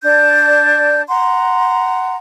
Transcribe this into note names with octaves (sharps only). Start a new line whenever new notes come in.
D4 D5 A5 G6
F#5 A#5 C6